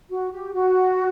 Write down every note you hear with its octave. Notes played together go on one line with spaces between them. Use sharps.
F#4
G4
F#4